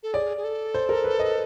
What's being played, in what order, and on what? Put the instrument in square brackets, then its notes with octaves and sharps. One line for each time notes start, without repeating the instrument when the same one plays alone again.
[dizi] A4
[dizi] G#4 [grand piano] D5
[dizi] G#4
A4
[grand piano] C5
A#4
B4
D#5